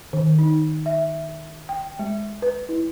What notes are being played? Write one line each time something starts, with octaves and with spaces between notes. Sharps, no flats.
D#3
D#4
E5
G5
G#3
B4
E4